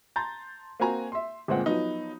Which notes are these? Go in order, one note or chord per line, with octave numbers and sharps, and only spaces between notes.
A5 A#5 C6 G6 A6
A#3 C4 F#4 G#5 A#5
E5 C6
G1 A#2 G#3 C4 F#5
F3 F#3 B3 D#4